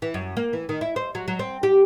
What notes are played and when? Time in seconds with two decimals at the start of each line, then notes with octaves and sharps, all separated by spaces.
0.02 E3
0.14 F#2
0.37 A#3
0.53 E3
0.69 D#3
0.81 E4
0.96 C5
1.15 F#3
1.28 F#3
1.39 C4
1.63 G4